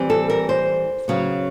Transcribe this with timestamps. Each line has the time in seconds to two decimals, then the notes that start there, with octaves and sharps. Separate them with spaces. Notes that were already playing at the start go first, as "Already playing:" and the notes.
Already playing: E3 G3 C4
0.10 A4
0.30 A#4
0.49 C5
1.08 C#3 F#3 B3